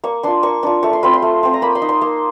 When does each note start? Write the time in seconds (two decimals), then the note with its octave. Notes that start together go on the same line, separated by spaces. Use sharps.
0.04 A#3 C#6
0.23 D4 F4 C6
0.43 A#3 C#6
0.63 D4 F4 C#6
0.83 A3 C#6
0.93 C6
1.03 C4 F4 B5
1.14 C6
1.22 A3
1.43 C4 F4
1.54 A#5
1.62 A#3 B5
1.75 C6
1.82 D#4
1.89 C6
2.02 A#3